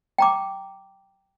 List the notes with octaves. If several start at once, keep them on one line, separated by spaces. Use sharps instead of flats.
G5 A#5 D6